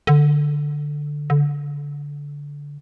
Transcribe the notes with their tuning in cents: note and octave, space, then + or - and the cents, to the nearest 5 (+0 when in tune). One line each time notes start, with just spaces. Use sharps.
D3 +5
D3 -20